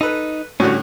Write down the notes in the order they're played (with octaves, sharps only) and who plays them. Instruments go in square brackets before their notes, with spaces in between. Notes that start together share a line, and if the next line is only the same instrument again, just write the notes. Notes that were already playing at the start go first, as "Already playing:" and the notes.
[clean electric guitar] D#4 [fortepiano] A4 B4
[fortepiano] A2 D3 [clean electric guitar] G3 C#4 [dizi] F#4